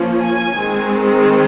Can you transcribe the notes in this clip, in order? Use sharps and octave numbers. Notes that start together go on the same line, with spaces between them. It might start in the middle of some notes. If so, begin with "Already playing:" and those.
Already playing: F3 A#3 C#4
G#5
D#3 G#3 C4